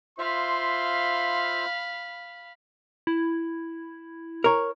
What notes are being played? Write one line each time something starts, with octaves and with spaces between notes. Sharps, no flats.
F4 C5 E5 F5 B5 C6
E4
A#4 C#5